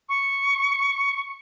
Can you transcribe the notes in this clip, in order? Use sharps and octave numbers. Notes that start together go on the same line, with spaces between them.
C#6